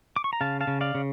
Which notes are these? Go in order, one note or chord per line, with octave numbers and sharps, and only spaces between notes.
D6
C#6
A#5
C#3 F5 A5
F5 A5
C#3
D5 F5
C#3